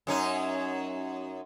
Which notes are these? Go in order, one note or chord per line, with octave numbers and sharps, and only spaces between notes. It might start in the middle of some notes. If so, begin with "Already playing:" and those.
F#2 C#4 D#4